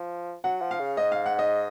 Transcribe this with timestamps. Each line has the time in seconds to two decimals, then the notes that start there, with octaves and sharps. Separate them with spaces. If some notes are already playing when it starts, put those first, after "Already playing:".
Already playing: F3
0.44 F#3 F#5
0.62 F3
0.71 F5
0.80 C#3
0.97 G#2 D#5
1.12 F5
1.26 F#5
1.39 D#5